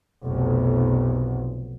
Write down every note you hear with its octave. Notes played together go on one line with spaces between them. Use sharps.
F1 B1